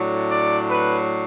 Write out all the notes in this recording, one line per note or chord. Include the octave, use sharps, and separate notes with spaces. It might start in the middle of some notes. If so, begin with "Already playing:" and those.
Already playing: A2 F#3 D4
D5
B4